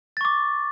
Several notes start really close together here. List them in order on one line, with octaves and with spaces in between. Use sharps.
A6 C#6 D6